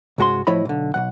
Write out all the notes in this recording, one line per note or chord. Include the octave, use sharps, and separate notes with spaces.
C2 G2 G#3 F#4 B5 C6
A2 F3 E4 C#5 D#5 B5
B1 D3
B1 D#3 F#5